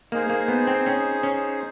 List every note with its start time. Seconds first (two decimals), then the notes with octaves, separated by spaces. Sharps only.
0.12 A#3 D#4 G#4 C5
0.30 A#3
0.48 B3
0.67 C4
0.86 C#4
1.23 C#4